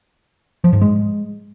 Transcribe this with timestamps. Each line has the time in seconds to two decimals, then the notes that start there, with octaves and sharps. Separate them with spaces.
0.64 F3
0.73 G#2
0.81 G#3